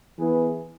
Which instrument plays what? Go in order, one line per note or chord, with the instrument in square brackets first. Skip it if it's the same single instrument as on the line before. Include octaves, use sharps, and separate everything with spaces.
[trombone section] E3 B3 E4 G#4 B4